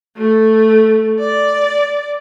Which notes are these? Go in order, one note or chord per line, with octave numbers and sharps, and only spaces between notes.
A3
D5